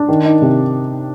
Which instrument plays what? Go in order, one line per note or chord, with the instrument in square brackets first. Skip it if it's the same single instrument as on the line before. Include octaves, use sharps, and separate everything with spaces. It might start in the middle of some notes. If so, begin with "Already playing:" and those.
Already playing: [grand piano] D4
D#3
D#4
C3